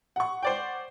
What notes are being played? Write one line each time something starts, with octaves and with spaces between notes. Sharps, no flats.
F#5 C#6
C5 D5 G5